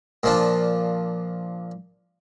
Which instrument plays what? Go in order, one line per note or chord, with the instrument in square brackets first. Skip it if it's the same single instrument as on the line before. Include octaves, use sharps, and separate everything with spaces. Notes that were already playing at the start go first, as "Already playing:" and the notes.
[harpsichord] A#2 F3 D4